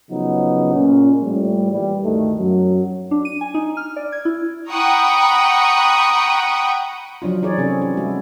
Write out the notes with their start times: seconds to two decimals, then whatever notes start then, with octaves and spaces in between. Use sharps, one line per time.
0.10 C#3 F3 F#3 B3 D#4
0.74 A#2 C#4
1.22 A2 F3 G3
1.72 A#2 E3 G3
2.03 D2 G2 D#3 A3
2.39 F#2 F#3
3.11 D4
3.25 D#7
3.41 G#5
3.54 D#4
3.77 F6
3.96 D5
4.12 G#6
4.25 E4
4.70 F#5 G5 A#5 B5 C#6 D#6
7.22 F3 F#3 D4 F4
7.42 E3 D#4 G#4 C#5 D5
7.58 C3 C4 C#4 E4 A4
7.82 C#4
7.97 G3 G#3 E4 F#4